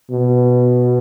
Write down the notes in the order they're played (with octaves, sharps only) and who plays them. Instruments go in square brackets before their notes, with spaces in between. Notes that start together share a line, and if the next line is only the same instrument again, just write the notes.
[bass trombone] B2